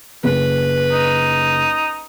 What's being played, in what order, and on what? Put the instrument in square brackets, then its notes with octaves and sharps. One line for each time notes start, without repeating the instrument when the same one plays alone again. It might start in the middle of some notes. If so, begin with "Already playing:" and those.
[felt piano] F#1 [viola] B4
[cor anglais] D#4